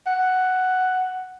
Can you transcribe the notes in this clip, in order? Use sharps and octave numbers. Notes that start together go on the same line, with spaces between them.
F#5